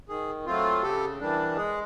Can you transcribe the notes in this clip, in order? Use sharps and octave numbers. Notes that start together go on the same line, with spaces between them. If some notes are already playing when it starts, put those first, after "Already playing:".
D#3 G#4
F#3 A3 C4 F4
C#3 G4 A4
E3 G3 A#3 D4
G#3 G#4